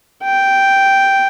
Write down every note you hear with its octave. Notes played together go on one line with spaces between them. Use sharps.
G5